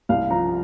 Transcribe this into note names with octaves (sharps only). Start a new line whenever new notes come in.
C2 F5
F3 A#5